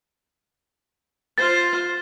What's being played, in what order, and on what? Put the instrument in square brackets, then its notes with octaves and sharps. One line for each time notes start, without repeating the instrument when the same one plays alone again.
[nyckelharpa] F4 C5 [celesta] A6